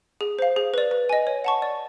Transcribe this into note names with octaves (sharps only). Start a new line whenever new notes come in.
G#4
C5 F5
G#4
B4 D5
B4
D#5 G#5
C#5
F#5 A5 C#6
D5